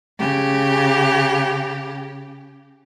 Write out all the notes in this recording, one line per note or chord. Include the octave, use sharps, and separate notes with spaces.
C#3 G4